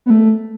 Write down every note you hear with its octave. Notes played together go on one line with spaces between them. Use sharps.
B3
A3